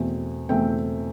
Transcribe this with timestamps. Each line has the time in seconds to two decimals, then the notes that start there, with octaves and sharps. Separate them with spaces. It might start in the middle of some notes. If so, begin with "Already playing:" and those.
Already playing: E2 B2 A3 C4
0.49 E2 B2 A3 C4 G5